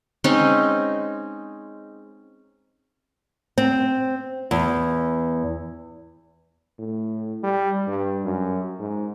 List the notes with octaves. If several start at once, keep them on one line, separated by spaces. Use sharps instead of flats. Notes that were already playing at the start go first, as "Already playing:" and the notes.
G#3 C4 C#4 D#4
C4
E2
A2
G3
G2
F#2
G#2